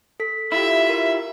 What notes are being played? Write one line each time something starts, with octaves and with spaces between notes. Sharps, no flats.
A4 B6
E4 F4 G4 E5
A#4